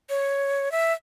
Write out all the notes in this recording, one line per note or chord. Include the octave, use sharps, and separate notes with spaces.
C#5
E5